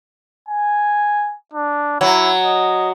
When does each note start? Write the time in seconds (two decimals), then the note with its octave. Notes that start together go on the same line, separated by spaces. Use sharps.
0.49 G#5
1.53 D4
2.01 F#3 E4
2.42 D#5